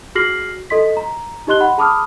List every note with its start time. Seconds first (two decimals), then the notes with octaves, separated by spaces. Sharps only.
0.15 F#4 G#4 F6 A#6 C7 F#7
0.70 A4 D#5 C6 B6
0.97 A#5
1.47 D#4 G4 D#5 C6 F#6 G7
1.60 F#5 B5
1.78 G#4 A5 B5 D6 D#6 F6